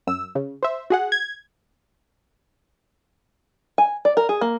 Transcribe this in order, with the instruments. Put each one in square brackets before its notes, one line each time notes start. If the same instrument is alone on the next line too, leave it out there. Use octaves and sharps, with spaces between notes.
[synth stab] F#2 E6
C#3
C5 E5
F#4 G#4 F#5
G#6
[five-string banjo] G#5
D5
A#4
G#4
A#3